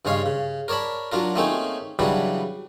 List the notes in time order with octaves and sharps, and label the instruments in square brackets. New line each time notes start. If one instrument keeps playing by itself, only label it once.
[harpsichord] G2 C#3 G#3 C#5 F5 C6
C#3
A#4 C#5 D5 A5 B5
F#3 D4 F4 A#4
A3 A#3 C4 C#4 D#4 G#4
C#3 E3 F#3 G3 B3 D4